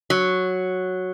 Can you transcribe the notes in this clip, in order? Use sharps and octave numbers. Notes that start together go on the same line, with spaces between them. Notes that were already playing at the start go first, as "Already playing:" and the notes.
F#3